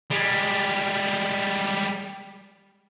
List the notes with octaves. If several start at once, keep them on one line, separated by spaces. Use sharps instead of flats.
G3 G#3